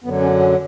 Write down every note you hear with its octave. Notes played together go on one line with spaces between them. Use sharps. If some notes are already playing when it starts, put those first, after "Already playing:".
F#2 D3 F#3 B3
C#4
C#4